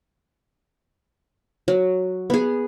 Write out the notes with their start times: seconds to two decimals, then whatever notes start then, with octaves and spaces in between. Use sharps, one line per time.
1.68 F#3
2.30 B3 G#4